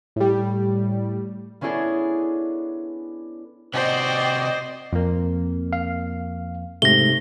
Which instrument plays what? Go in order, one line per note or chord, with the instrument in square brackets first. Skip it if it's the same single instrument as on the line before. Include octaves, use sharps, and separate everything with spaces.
[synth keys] A2 G3
[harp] B3 C#4 D4 E4 G#4 A4
[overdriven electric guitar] C3 F#4 [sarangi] C5 [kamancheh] D5 G5 [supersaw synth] D#5 C7
[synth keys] F2 A#3
[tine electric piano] F5
[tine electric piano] G#2 C3 A3 [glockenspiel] A#6 G7